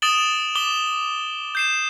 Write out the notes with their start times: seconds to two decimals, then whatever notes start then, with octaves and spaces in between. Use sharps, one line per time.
0.02 D#6 A6 D7 E7 F#7 G7
0.55 D6 E7 G7
1.55 G6 C7 E7